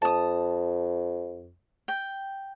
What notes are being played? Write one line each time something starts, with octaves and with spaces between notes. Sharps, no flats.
F2 A5 D#6
G5